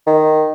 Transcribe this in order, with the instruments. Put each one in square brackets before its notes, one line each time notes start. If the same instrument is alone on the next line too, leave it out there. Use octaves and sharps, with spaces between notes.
[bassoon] D#3